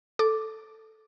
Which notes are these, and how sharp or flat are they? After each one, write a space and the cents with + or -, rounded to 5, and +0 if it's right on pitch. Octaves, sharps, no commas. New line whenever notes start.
A4 +0 D6 +0